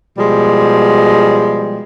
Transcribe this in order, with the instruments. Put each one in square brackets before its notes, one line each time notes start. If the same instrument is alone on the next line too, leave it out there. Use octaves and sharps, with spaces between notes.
[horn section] B2 F3 G3 G#3